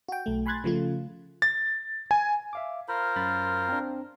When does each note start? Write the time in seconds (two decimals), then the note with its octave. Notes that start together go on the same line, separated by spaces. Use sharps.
0.08 F#4 G5
0.26 B1 A3
0.46 G#5 B5 C6 F#6 G#6 A6
0.64 C#3 F3 A3 F4
1.42 A6
2.11 G#5
2.53 E5 F5 D6
2.88 F4 A#4 C5 B5
3.16 F#2 B5 A6
3.69 C4 D4